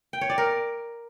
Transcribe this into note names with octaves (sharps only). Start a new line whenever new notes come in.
G5
C#5
D5
A#4